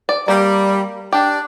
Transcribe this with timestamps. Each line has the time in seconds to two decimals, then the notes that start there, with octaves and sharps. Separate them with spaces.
0.09 D5
0.28 G3 A#3
1.12 D4 G4